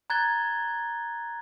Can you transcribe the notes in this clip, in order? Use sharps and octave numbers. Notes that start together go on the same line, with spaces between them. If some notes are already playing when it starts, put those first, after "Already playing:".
A#5 F#6 G#6 A6 G7